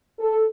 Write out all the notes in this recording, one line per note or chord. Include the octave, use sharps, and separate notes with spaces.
A4